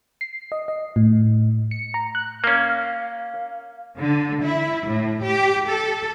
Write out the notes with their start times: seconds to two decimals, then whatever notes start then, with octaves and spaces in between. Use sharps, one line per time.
0.21 C7
0.52 D#5
0.68 D#5
0.96 A2
1.71 C#7
1.94 A#5
2.15 F#6
2.44 A#3 C#4 F5
3.98 D3
4.41 E4
4.88 A2
5.24 G4
5.68 A4